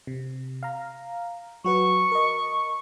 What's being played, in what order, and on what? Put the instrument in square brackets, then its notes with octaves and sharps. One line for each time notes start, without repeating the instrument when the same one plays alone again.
[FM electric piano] C3
F5 A#5
[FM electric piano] F#3 F#4 B4 [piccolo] C#6
[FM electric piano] A#4 D#5